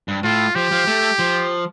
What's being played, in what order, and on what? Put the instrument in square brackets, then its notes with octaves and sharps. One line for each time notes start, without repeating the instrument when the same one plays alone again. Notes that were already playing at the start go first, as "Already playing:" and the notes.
[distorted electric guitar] G2
[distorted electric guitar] A2 [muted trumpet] F4
[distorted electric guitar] F3 [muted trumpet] G4
[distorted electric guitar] F3
A3
F3